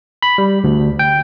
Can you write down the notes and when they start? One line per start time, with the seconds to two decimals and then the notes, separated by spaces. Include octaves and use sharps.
0.23 B5
0.38 G3
0.64 D2
0.99 G5